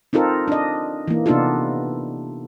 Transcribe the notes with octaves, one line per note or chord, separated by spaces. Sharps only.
C4 D#4 F4 A4 A#4
D4 D#5
E3 A#3
C3 B3 D4 D#4 F4 A4